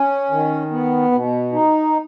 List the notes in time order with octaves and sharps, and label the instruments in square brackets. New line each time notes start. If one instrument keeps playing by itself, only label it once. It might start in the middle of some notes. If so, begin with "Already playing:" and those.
Already playing: [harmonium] C#4
D#3
B3
B2
D#4